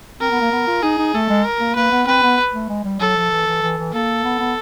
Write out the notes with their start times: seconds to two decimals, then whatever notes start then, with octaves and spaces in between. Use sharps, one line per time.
0.21 C4 A#4
0.31 B3
0.41 A#3
0.52 B3
0.67 F4
0.83 D#4 G#4
0.98 D#4
1.14 A3 A4
1.29 G#3
1.45 A#4
1.60 A#3
1.75 A#3 B4
1.91 B3
2.07 C4 B4
2.23 B3
2.53 A3
2.69 G#3
2.84 G3
3.00 F#3 A4
3.16 F3
3.31 E3
3.46 E3
3.62 E3
3.77 E3
3.93 A#3 A4
4.24 B3
4.39 B3